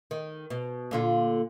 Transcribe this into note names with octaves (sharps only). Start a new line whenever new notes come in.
D#3
B2
A#2 D3 F4